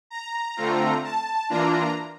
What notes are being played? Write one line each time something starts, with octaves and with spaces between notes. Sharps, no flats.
A#5
D3 A3 C4 F4
A5
E3 A#3 D4 F4 A#5